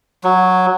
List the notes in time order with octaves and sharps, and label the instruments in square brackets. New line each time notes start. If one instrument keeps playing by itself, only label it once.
[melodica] F#3